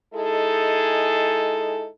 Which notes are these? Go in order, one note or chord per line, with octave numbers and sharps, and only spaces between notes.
G#3 D#4 E4 G#4 A4